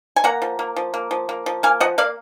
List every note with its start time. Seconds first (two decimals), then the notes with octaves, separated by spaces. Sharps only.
0.16 G#5
0.24 A#3 F#5 A#5
0.42 F3
0.59 A#3
0.76 F3
0.94 A#3
1.11 F3
1.29 A#3
1.46 F3
1.63 A#3 F5 G#5
1.80 F3 D#5 F#5
1.98 A#3 D5 F5